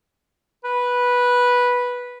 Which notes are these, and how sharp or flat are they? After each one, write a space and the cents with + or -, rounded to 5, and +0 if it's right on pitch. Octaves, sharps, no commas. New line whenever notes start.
B4 -10